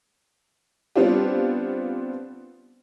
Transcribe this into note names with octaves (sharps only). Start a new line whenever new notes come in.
G3 B3 C4 D4 F4 G4